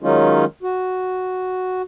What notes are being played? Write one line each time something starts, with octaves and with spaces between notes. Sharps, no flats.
D#3 F#3 G#3 C#4 D#4 F4
F#4